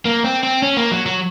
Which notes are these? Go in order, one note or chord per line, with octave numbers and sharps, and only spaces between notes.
A#3
C4
C4
C#4
A#3
F#3
F#3